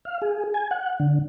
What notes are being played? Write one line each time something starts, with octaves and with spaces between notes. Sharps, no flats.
F5
G#4
G#5
F#5
D3